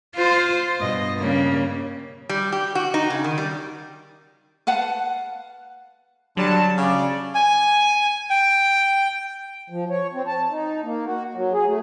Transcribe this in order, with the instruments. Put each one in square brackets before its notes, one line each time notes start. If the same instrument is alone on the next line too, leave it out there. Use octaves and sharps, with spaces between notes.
[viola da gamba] F4 C5
G2 B2 D#5
C#3 G3 A#3
[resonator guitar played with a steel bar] G3
G4
F#4
D#4
C#3
D#3
G3
[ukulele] B4 F5 F#5 A5
[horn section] D3 G3 A5 [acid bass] F#3
[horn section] C#3 D5
[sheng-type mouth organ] G#5
G5
[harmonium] F3
C#5
C4
A5
D#4
A#3
F#4
F#3
G#4
A3